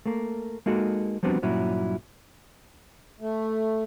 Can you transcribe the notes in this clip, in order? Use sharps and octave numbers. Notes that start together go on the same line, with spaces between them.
A3 A#3
G#3 A#3 D#4 F#4 A4
F3 G3 B3 C4 D4 F#4
G2 A#2 F#3 C#4 E4
A3